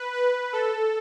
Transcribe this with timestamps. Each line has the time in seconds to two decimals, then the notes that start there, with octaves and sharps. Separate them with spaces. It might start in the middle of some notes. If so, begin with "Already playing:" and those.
Already playing: B4
0.13 B4
0.53 A4